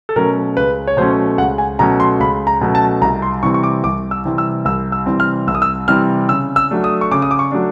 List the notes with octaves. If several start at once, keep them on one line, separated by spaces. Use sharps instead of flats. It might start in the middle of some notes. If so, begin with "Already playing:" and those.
A4
B2 F#3 A3 C#4 A#4
C#2 B4
C#5
B2 F#3 A3 C#4 C5
C#2 F#5
G#5
B2 F#3 A3 C#4 A#5
C6
C#2 B5
A#5
B2 F#3 A3 C#4
A5
C2 A#5
C6
C3 E3 G3 C4 C#6
C#6
D6
C2 D6
E6
C3 E3 G3 C4
E6
C2 E6
E6
C3 E3 G3 C4
F6
C2 E6
D#6
E6
C3 E3 G3 C4 F6
C#3 E6
E6
F#3 A3 D4
D#6
C#6
C#3 D6
D#6
D6
C#6
F#3 A3 D4